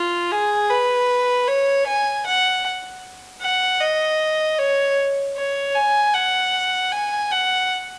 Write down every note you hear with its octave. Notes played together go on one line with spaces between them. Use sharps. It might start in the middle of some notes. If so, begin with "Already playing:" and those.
Already playing: F4
G#4
B4
C#5
G#5
F#5
F#5
D#5
C#5
C#5
G#5
F#5
G#5
F#5